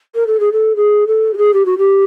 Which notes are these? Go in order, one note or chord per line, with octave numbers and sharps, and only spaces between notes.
A#4
A4
G#4
A4
G#4
A4
G4
G#4
G4
F#4
G4